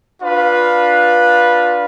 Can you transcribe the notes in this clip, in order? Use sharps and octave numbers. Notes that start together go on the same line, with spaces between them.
D4 F4 B4 F5